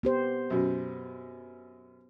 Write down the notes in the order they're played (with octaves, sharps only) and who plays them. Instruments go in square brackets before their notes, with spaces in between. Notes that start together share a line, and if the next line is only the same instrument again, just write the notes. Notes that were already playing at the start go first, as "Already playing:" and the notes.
[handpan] B3 G4 C5
[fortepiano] F#2 B2